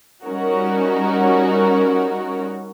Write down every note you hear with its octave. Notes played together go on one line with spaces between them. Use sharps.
G3 C#4 D#4 F#4 A#4